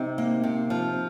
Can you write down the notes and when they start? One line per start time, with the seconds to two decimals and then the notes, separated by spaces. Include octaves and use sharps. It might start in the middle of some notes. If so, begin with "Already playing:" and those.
Already playing: C3 D#4
0.18 A#3
0.44 C3
0.70 F3